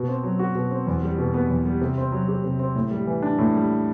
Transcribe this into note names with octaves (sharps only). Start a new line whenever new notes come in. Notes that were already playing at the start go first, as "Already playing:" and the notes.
Already playing: B2
C4
F#3
F#4
B2
C4
E2
G3
B2
B3
E2
G3
C3
C4
F#3
G4
C3
C4
A2
G3
E3
D4
A2
G3